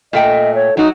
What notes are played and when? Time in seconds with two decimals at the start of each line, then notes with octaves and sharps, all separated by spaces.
0.13 A#2 A3 D#5 G5
0.55 C#5
0.77 F#3 D#4 F#4